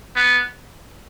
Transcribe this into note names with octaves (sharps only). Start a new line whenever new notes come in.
B3